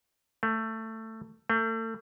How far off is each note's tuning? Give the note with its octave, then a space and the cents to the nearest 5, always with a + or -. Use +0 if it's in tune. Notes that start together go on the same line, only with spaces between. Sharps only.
A3 +15
A3 +35